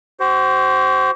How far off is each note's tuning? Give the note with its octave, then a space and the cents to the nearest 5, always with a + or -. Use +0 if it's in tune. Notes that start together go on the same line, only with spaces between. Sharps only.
F#4 +40 C5 +0